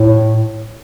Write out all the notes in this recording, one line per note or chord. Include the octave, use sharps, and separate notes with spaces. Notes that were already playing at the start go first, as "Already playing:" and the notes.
Already playing: A2